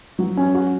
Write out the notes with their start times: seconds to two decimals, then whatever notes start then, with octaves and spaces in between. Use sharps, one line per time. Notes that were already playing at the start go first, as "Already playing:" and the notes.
0.19 F#3
0.37 C#4
0.55 F#4